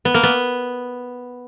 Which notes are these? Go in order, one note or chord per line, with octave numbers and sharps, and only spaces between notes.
B3
A#3
B3